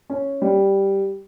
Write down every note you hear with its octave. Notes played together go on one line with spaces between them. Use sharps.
C#4
G3